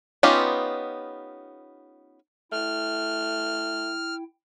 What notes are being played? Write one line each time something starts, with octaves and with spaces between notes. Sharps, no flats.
B3 C#4 D#4 F4 G4
A3 E4 G5 F6